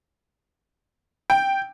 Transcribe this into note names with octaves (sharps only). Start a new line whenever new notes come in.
G5